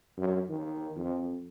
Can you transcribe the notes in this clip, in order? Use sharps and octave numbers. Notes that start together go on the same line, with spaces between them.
F#2
D#3
F2